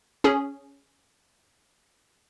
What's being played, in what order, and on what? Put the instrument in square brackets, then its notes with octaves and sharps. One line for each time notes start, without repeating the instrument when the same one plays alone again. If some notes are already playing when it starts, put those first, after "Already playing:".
[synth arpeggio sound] C#4 G#4